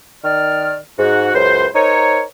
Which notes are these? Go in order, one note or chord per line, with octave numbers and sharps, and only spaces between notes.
D#3 D5 F6
G#2 F#4
C#2 F#2 B4 C5
D#4 A#4 C5 C#5